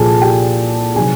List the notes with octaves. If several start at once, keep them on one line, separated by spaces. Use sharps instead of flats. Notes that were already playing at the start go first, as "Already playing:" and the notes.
Already playing: C2 A#2 F3 G#4 A4 G#5 A5
G4 G5
C3 D#3 F#3 G#4 G#5